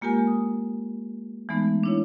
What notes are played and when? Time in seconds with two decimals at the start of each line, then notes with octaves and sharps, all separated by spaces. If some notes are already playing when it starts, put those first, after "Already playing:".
0.01 G#3 A#3 F4 G4 A#4 G#5
0.27 D#6
1.49 E3 G#3 A3 B3 D#4
1.83 D4 E4 C#5